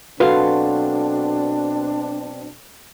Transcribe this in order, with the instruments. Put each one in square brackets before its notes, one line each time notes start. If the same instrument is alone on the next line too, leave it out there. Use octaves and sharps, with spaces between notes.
[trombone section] B2 C4 D4 [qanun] F#3 F5 C6 [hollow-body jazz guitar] A4 B4